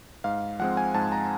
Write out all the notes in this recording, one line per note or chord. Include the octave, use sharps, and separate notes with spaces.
G#2 F5
F3 G#3 C4 F#5
G#5
G#2 A5
A#5